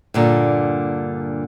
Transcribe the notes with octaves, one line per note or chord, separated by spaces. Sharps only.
G2 A#2 D3